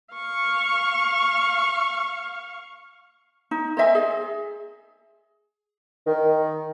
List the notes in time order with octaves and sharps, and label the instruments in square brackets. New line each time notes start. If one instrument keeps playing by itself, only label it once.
[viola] F5 C#6
[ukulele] D#4
C5 D#5 E5 G#5
G#4
[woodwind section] D#3